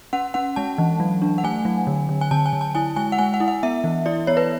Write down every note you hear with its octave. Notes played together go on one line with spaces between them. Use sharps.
C#4 F#5
C#4 F#5
G#3 A5
E3
F#3
D4
F#5
A3 G#5
F#3
D3
D3
G#5
D3 A5
G#5
D3
A5
E4 G#5
G#3 G#5
F#5
G#3 G#5
F#5
E4
F#5
B3 E5
E3
E4 D5
B3 C#5
B4